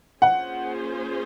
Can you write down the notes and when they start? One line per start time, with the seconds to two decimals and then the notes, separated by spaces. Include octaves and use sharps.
0.22 A#3 C#4 F4 G#4 C5 F#5